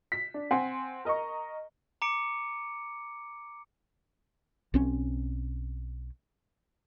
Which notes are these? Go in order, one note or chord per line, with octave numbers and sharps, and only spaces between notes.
B6
D4
C4 F#5 G#5 C6
A#4 D#5 A#5 C#6
A#5 D6 C#7 D7
B1 C4 C#4